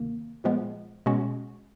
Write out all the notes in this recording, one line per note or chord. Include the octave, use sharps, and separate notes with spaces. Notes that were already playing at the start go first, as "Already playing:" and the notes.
Already playing: D2 C3 D#3 A#3
A#2 F3 G#3 B3
B2 G#3 C#4 F#4